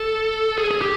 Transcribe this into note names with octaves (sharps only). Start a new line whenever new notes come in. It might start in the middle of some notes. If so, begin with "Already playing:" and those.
Already playing: A4
G#4
G#4
G4